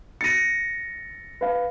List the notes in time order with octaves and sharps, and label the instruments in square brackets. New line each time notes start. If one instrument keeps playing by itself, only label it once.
[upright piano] A6 D#7 [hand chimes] A#6 C#7
[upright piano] B4 F5